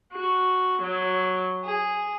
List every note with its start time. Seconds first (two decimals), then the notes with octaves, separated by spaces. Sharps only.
0.12 F#4
0.81 F#3
1.66 G#4